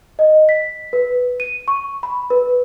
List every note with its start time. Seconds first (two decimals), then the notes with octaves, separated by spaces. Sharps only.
0.19 D#5
0.49 B6
0.93 B4
1.40 D#7
1.68 C#6
2.03 B5
2.30 B4